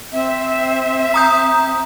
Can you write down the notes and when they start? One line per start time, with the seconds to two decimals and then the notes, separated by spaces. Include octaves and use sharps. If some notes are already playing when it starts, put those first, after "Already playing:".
0.12 C4 E5
1.14 A#5 D#6 G6